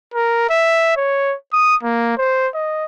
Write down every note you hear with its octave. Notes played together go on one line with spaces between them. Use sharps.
A#4
E5
C#5
D#6
A#3
C5
D#5